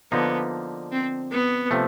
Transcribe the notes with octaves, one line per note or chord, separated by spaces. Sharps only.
D3 F3 A#3 B3 D#4
C4
B3
C3 F3 A3